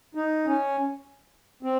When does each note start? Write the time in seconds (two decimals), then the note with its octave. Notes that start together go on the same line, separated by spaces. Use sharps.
0.15 D#4
0.46 C#4
1.63 C4